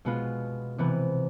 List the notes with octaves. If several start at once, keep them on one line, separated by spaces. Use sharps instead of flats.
B2 G#3 B3 F4
C3 E3 B3